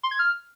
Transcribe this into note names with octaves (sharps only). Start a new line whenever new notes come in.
C6
G#6
F6